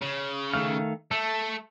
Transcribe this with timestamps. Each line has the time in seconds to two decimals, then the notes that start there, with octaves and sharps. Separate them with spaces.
0.02 C#3
0.54 D#3 A3 F5
1.11 A3 A4